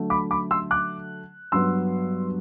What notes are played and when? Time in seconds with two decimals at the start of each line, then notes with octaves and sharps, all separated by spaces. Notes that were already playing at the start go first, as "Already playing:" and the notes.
Already playing: D3 F#3 A3
0.10 B5 D6
0.31 B5 D6
0.51 C6 E6
0.71 D6 F#6
1.52 G2 F#3 B3 C6 E6